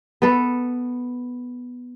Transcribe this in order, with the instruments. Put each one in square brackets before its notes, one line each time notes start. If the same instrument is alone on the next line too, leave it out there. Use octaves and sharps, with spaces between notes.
[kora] B3 A4